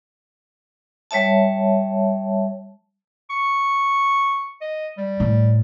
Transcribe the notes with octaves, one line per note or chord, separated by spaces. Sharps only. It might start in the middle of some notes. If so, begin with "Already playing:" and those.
G3 C#5 E5 A5
C#6
D#5
G3
A2